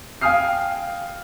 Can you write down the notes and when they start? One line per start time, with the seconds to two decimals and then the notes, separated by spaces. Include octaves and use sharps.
0.21 F5 G5 G#5 D#6 F6 C7